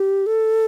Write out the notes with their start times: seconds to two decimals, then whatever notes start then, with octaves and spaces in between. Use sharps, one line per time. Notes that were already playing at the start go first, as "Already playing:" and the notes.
Already playing: G4
0.26 A4